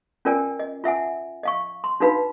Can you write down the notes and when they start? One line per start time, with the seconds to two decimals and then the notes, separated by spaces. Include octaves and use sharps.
0.25 C#4 F4 A#4 D5 G5 G#5
0.59 D#5
0.84 F4 E5 F#5 G#5
1.43 D#5 F5 C#6
1.84 C6
2.00 D4 D#4 F#4 B4 F5 B5